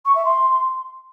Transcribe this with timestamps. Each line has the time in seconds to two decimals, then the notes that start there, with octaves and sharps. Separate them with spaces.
0.05 C#6
0.15 E5
0.25 C6